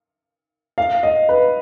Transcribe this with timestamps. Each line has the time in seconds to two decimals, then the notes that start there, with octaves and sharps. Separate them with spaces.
0.78 F5
1.03 D#5
1.29 B4